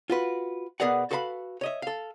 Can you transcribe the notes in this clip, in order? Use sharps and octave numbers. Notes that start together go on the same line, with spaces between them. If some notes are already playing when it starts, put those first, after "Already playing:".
F4 F#4 B4
B2 B3 G#4 A#4 D5 F#5
F#4 A4 B4 F5 A5 B5
C#5 D#5 E5
A4 F5